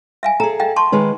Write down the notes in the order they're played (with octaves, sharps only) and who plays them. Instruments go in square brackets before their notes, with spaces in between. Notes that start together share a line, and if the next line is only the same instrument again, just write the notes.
[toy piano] E5 F5 G#5
[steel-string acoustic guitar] G#4 A4 [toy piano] A#5
[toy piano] D#5 F5 G5
A5 C6 C#6
[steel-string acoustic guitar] D#3 G#3 B4